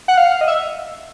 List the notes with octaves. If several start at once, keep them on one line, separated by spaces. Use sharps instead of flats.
F#5
F5
D#5
E5